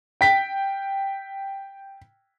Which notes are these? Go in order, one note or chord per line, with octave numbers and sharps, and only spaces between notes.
G5 B6